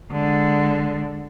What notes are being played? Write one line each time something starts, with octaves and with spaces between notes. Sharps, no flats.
D3 G#3